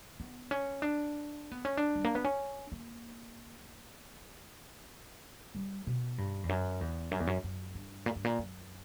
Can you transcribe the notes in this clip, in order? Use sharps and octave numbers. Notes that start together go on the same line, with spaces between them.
B3
C#4
D4
B3
C#4
D4
G3
A#3
B3
C#4
A#3
G3
B2
G2
E2
F#2
E2
F#2
E2
F#2
F#2
G2
A#2
G2
A#2
F#2